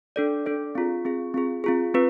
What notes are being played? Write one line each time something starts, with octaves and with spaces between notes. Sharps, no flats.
D4 A4 D5
D4 A4 D5
C4 F4 G#4
C4 F4 G#4
C4 F4 G#4
C4 F4 G#4
C4 F4 B4